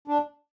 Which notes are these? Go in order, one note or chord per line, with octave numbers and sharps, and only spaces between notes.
D4